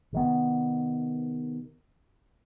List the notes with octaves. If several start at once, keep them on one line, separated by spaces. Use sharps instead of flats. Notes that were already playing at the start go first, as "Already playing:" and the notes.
C3 D#3 B3